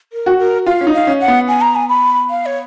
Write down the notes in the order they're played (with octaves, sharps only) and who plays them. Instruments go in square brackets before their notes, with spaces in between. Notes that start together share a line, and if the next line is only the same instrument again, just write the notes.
[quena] A#4
[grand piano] F#4
[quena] A#4
[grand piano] F4 [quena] F5
[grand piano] C#4
D#4
[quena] F5
[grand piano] C#4
[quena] F#5
[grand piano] B3
[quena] G#5
A#5
G#5
B5
F5
C#5